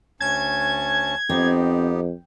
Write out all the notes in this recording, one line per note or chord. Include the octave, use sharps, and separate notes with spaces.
D2 C#4 A5 G#6
F2 B3 C4 D#4 G4